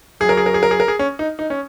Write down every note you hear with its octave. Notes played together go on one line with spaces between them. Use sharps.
F#2 F#3 G#4
A#4
G#4
A#4
G#4
A#4
G#4
A#4
G#4
C#4
D#4
D#4
C#4